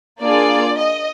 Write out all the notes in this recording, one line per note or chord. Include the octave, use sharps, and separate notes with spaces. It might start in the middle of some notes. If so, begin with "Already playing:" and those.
A#3 D4 F4 G#4 D5
D#5